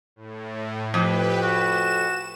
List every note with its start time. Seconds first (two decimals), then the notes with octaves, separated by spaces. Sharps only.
0.16 A2
0.94 F2 G4 B4
1.43 F#4 E7